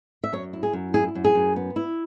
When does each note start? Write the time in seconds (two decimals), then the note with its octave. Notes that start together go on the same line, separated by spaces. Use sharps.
0.24 E5
0.33 F#2 C#5
0.53 E4
0.63 G#4
0.73 F#2
0.94 E4 G#4
1.15 F#2
1.24 G#4
1.35 F#2
1.56 B3
1.76 E4